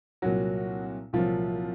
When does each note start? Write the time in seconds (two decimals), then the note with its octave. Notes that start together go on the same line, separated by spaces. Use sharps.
0.22 C2 A#2 F#3 F#4
1.13 C2 A#2 F3 F#3 F4